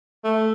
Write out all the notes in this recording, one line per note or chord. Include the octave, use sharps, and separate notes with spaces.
A3